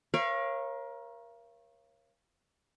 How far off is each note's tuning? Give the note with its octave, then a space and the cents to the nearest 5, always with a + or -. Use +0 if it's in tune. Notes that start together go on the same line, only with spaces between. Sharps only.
A#4 +25 C#5 -25 F5 -35